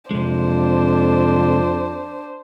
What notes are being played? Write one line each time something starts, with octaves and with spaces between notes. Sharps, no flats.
F2 C3 G#3 D4 C5